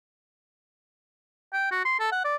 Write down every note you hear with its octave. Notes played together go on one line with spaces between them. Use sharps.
G5
F#4
C6
A4
F#5
D5